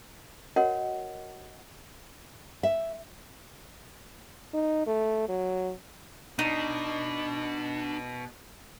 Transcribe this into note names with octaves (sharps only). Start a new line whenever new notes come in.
F#4 A#4 C#5 D#5 F#5
E5
D#4
A3
F#3
B2 D4 D#4